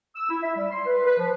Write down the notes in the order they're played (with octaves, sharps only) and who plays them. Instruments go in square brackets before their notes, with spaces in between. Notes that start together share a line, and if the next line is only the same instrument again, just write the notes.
[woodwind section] E6
E4
E5
G3
C6
B4
B4
F3